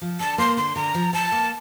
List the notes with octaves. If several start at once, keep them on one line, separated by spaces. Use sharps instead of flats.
F3
D3 A5
A#3 C6
D3 C6
D3 A#5
F3
F3 A5
A#3